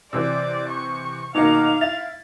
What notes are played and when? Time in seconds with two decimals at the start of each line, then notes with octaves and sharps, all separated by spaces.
0.13 C3 E3 D5 E6
0.70 C#6
1.35 B2 D#3 A#3 D#4 F5 D6 C#7 F7
1.81 E4 A6